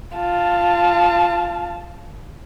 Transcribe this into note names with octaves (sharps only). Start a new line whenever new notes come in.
F4 A5